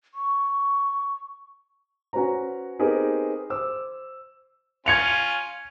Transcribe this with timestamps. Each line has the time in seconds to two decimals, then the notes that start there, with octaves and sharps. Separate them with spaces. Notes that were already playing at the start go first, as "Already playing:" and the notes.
0.14 C#6
2.13 C#4 F#4 B4 C5 A#5
2.79 B3 C4 D#4 G4 G#4 A#4
3.50 C5 D6 E6
4.86 C#4 F4 G#6 C#7 F7